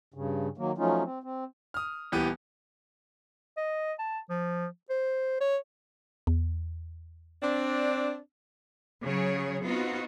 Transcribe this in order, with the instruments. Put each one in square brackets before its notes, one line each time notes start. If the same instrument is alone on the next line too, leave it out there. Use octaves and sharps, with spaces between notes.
[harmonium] G2 C#3
D#3 F#3 A#3
F3 F#3 A3 C#4 D#4 F4
C4
C4
[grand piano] D#6 F6
D#1 E3 B3 G4
[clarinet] D#5
A5
F3
C5
C#5
[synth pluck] E2
[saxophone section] C4 D4
[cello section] C#3 F#3 G#4 C#5
B3 C4 D#4 F4 F#4